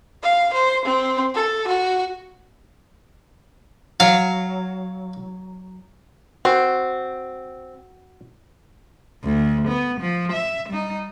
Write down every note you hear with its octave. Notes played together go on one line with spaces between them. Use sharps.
F5
C5
C4
A4
F#4
F#3 F5
C4 F#4
D2
B3
F3
E5
G3 D#4